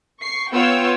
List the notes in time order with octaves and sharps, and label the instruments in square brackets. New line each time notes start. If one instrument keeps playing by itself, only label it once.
[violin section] C#6 C7
B3 F4 C#5 G5 E6